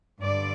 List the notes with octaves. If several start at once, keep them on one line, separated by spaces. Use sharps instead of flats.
G2 D3 D5